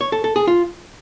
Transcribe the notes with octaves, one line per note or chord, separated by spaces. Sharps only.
C#5
A4
A4
G#4
F4